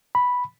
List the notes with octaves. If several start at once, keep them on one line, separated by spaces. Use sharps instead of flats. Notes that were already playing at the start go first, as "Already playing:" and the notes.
B5